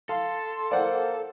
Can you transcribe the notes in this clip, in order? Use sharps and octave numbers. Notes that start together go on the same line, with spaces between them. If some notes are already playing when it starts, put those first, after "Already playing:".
A4 F5 C6
A#3 C5 D5 F#5